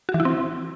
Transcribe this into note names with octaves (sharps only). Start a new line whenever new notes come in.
F#4
E3
E4
C4